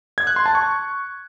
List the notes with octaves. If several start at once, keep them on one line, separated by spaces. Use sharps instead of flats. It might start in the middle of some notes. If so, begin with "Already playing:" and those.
G#6
F#6
C6
A5
C#6